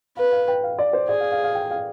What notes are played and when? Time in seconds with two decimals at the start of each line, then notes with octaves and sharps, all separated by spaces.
0.17 B4 F5
0.32 F5
0.48 G5
0.63 F5
0.79 D5
0.93 C5
1.09 G#4 D5
1.20 F5
1.32 F5
1.44 F5
1.55 G5
1.71 F5